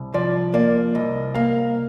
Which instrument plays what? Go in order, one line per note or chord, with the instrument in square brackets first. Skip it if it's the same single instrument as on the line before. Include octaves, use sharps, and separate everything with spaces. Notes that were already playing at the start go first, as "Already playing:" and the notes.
Already playing: [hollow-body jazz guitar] C2
[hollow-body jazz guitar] F3 [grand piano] D5
[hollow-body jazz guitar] A#3 [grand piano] D5
[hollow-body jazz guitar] C2 [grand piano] D#5
[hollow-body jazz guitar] A#3 [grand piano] F5